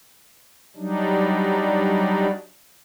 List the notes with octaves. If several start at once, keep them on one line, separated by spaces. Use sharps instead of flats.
F#3 G3 D4 D#4